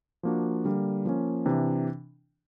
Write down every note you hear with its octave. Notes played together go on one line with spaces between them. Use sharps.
F3 A#3 D4 F#4
D3 G3 A#3
F3 A#3 C#4
C3 E3 D4